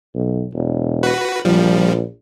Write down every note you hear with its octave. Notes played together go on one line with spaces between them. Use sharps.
B1
E1
F#4 B4
A#1 F3 G3